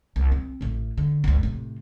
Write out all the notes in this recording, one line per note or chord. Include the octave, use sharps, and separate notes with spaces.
C2
C4
A1 A2
D3
G#1 D2
A2 C3